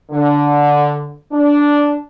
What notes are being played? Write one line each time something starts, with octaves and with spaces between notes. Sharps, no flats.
D3
D4